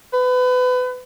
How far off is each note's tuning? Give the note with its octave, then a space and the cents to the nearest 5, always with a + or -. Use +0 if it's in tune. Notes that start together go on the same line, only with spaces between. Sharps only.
B4 +30